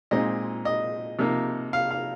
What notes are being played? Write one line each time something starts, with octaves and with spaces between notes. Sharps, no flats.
A#2 G#3 C4 D#4 D#5
D#5
C3 F3 A#3 D#4
F5
F5